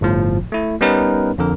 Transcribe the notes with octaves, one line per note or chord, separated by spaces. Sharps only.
G1 A2 F3
A3 E4
G3 B3 C#4 D#4 A#4 B4
F2 D3 A#4